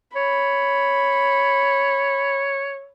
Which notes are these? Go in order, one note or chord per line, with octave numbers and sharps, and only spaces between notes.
C#5 B5